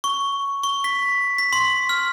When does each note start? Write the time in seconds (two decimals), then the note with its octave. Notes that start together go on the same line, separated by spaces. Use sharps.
0.04 C#6
0.63 C#6
0.84 B6
1.38 B6
1.53 C6
1.89 F6